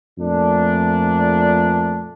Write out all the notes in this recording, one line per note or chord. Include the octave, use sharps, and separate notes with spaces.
F2 A#2 A3 D4